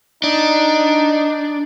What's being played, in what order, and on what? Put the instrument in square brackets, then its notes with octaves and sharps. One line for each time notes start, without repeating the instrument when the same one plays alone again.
[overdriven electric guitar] D4 [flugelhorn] D#4